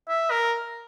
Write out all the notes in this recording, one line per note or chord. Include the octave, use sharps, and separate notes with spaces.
E5
A#4